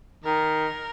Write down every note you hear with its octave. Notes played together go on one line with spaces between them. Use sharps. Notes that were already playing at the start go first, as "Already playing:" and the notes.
D#3 A#4